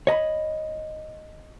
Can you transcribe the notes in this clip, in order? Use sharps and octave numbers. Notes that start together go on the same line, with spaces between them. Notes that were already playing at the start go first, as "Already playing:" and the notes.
C#5 D#5 A#5 B5